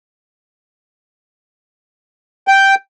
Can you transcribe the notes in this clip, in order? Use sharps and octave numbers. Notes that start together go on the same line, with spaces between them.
G5